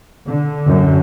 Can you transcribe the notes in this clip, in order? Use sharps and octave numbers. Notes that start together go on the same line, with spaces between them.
D3
F#2